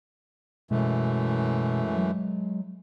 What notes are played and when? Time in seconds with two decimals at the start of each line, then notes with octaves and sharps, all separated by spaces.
0.71 F#2 B2 E3 G#3 A3
1.96 F#3